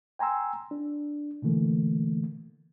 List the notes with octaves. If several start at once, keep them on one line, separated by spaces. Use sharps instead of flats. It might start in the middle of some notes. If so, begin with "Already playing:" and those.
G5 G#5 A#5 C6 E6
D4
B2 D3 E3 A3 A#3